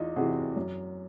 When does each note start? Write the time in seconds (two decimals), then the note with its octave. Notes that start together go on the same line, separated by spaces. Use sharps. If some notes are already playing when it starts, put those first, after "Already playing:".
Already playing: E2 D#4 F4
0.16 C3 E3 F#4 G#4
0.56 F#2